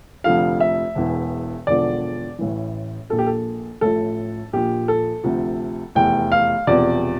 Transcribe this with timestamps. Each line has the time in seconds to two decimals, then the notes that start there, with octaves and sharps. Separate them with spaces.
0.24 F1 F2 D3 F3 F5
0.60 E5
0.95 E1 E2 E3
1.67 E1 E2 D3 F3 D5
2.39 A1 A2 E3
3.09 A#1 A#2 F3 A4
3.19 G4
3.27 A4
3.81 A1 A2 F3 A4
4.53 A#1 A#2 F3 G4
4.88 A4
5.24 D2 C3 F3
5.95 F1 E2 E3 G5
6.32 F5
6.67 E1 E2 C3 F3 D5